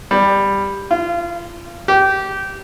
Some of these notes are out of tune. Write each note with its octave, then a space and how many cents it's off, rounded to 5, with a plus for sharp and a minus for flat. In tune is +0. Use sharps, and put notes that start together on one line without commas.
G3 +10
F4 -25
G4 -20